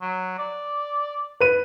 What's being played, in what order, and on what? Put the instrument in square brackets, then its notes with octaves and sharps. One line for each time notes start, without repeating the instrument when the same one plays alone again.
[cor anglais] F#3
D5
[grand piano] B4 D#7